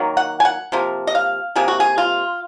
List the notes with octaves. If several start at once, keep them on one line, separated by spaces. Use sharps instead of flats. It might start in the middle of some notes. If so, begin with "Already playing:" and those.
Already playing: D#3 F#3 A#3
F#5
G#5
F#5
C3 F3 A#3
D#5
F5
C3 F3 A#3 G#4
F#4
G#4
F4